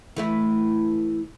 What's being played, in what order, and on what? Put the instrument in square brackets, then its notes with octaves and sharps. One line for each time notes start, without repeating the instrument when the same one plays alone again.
[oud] E3 A3 E4